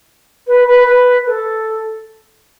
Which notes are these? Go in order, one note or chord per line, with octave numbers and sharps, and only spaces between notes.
B4
B4
B4
B4
A4